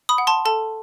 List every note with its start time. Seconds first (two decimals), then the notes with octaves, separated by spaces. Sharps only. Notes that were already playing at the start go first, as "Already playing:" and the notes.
0.09 B5 D#6
0.18 F#5
0.27 A5 C6
0.45 A4 A5